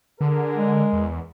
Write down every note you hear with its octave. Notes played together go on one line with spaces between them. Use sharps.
D3 G#4 A#4
G#3
E2